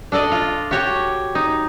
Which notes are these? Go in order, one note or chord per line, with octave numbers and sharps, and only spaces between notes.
D4 A4 D5 D#5
F4
F#4 G4 C#5
D#4